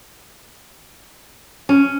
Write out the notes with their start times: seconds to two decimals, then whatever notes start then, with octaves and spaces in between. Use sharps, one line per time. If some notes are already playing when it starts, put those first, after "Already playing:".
1.69 C#4